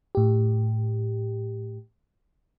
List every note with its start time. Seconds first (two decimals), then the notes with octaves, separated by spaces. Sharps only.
0.15 A2 G4